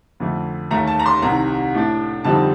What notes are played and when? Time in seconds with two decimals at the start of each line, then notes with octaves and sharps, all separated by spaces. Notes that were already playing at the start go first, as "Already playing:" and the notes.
0.20 F2 D3 A3
0.71 D#2 D#3 A3 A#5
0.87 A5
0.99 A#5
1.06 C6
1.22 C2 C3 D#3 A#5
1.74 A2 A3 D4
2.24 F2 D3 G3 C4 D#4 A5